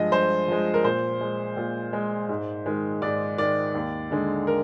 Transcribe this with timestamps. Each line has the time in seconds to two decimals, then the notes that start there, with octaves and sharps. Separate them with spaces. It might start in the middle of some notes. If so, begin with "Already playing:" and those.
Already playing: G2 F3 G#3 D#5
0.12 G2 C5
0.48 F3 G#3
0.74 A#4
0.84 A#2 C5
1.21 G#3
1.57 A#2
1.93 G#3
2.29 G#2
2.66 D#3 G#3
3.02 G#2 D5
3.38 D#3 G#3 D5
3.75 D#2
4.11 D3 G#3
4.47 A#4